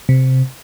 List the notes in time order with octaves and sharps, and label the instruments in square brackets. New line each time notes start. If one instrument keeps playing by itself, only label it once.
[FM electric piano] C3